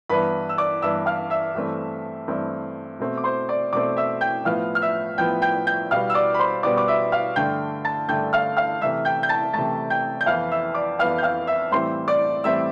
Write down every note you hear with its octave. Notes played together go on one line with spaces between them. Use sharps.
G2 E3 B3 B4 B5
E6
D5 D6
G2 E3 B3 E5 E6
F5 F6
E5 E6
G2 E3 A3 C4
G2 E3 A3 C4
B2 A3 C4
D6
C5 C6
D5 D6
B2 A3 C4 D5 D6
E5 E6
G5 G6
A2 F3 B3 F5 F6
F6
E5 E6
A2 F3 B3 G5 G6
G5 G6
G5 G6
B2 G3 B3 F5 F6
E6
D5 D6
B5
C5 C6
B2 G3 B3 D5 D6
D6
E5 E6
F5 F6
G2 D3 A3 G5 G6
A5 A6
G2 D3 A3 G5 G6
F5 F6
F5 F6
C3 E3 A3 E5 E6
G5 G6
G6
A5 A6
C3 E3 A3 A5 A6
G5 G6
G6
F2 E3 B3 F5 F6
E5 E6
D5 D6
F2 E3 B3 F5 F6
G6
F5 F6
E5 E6
A2 E3 G3 C4 C5 C6
D5 D6
A2 E3 G3 C4 E5 E6